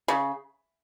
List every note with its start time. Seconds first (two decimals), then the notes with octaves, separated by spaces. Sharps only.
0.08 C#3